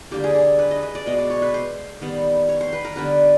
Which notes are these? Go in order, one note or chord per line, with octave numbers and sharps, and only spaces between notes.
D3 G3 A#3 G4
G#4
G#4
B4
D#5
D#5
D5
B2 G#3 B3 D#5
D5
C#5
B4
C5
D#3 G3 B3
C#5
C5
B4
A#4
D3 G3 B3 B4